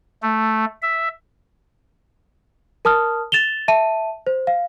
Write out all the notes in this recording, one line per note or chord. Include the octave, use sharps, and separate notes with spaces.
A3
E5
A#4 A5 D#6 F6
A6 E7 F7 G7
E5 A5 D#7
C5
F5